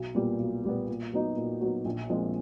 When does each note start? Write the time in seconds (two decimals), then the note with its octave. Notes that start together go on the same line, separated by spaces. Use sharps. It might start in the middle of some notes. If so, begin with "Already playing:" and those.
Already playing: B1
0.15 A#2 G3 B3
0.39 B1
0.64 A#2 G3 B3
0.89 A#2
1.13 F#3 B3 D#4 F#4
1.37 A#2
1.61 F#3 B3 D#4 F#4
1.85 A#1
2.10 A#2 F3 G#3 C4